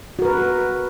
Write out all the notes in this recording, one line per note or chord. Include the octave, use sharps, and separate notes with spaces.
F#4 A#4 B4